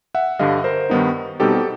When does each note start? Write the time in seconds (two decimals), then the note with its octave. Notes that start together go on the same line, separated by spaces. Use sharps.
0.15 E5 F#5
0.39 G2 D3 G3 D#5 F5
0.64 A#4 C5
0.89 G2 D#3 G3 B3 D#4
1.40 B2 G3 C4 D#4 G4 A4
1.55 G4